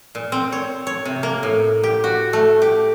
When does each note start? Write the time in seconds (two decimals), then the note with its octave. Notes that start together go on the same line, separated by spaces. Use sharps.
0.15 A#2
0.32 C4
0.52 C#5
0.87 C#5
1.05 C3
1.23 A#3
1.43 A2
1.83 G4
2.04 F#4
2.33 A3
2.62 G4